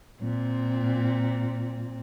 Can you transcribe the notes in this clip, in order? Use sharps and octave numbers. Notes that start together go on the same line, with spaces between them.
A#2 C4